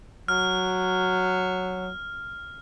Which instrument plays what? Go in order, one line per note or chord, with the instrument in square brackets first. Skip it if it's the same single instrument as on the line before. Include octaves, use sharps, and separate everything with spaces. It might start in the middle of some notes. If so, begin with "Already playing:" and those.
[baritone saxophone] F#3 [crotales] F6